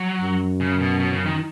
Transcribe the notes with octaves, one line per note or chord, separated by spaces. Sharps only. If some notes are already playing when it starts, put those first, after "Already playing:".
Already playing: F#3
F#2
C#3
B2
B2
C#3
D#3